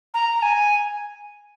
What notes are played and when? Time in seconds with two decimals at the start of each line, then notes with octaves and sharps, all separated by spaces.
0.14 A#5
0.38 A#5
0.42 G#5